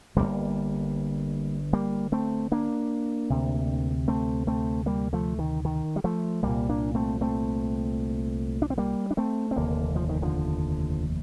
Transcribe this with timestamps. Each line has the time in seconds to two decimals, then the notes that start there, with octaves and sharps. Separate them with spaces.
0.16 G1 G2 D3 G3 A#3
1.73 G3 A#3
2.12 A3 C4
2.52 A#3 D4
3.30 D2 C3
4.08 A3 C4
4.47 A3 C4
4.86 G3 A#3
5.13 F3 A3
5.39 D#3
5.65 D#3
5.96 G3
6.04 F3 A3
6.43 C2 A#2 G3 A#3
6.69 A#3 D4
6.95 A3 C4
7.21 A3 C4
8.62 D4
8.70 C4
8.78 G3 A#3
9.11 D4
9.17 A3 C4
9.51 C4
9.56 F1 D#2 D3 A#3
9.96 F3
10.09 D#3
10.22 D3 F3